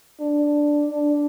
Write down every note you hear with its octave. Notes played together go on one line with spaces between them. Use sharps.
D4
D4